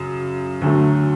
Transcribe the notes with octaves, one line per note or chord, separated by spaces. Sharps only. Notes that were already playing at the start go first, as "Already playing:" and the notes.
Already playing: F#2 C#3
D2 D3 F#3 A3